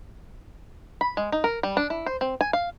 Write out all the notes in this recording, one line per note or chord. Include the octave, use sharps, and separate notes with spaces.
B5
G#3
D#4
A#4
G3
D4
E4
C5
C4
G#5
F5